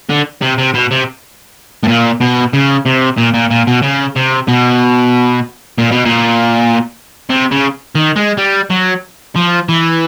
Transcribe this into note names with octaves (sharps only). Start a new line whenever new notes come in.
D3
C3
C3
B2
C3
A2
A#2
B2
C#3
C3
A#2
A#2
A#2
B2
C#3
C3
B2
A#2
B2
A#2
C3
C#3
D#3
G#3
G3
F#3
F3
E3